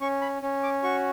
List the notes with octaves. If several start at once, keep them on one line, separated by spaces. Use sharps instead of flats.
C#4 C#6
B5
C#4
D6
F#4 C#6